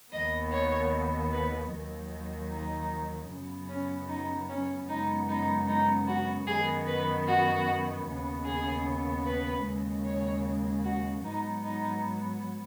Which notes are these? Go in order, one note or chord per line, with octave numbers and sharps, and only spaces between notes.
D#2 D#3 B3 D#5
C#5
B4
D#2 D#3 F#3
D#4
F#2 C#3 F#3 B3
C#4
D#4
C#4
F#2 C#3 G#3 B3 D#4
D#4
D#4
F#4
F#2 D#3 B3 G#4
B4
F#4
D#2 C#3 B3
G#4
B4
D#2 C#3 G#3
C#5
F#4
G#2 F#3 B3 D#4
D#4